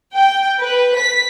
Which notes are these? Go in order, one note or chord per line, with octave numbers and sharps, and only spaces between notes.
G5
B4
B6